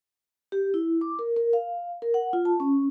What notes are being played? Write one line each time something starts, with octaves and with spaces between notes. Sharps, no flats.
G4
E4
D6
A#4
A#4
F5
A#4
F#5
F4
A5
C#4